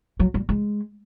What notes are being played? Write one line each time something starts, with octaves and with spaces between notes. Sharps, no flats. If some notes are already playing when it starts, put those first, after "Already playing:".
F#3
G3
G#3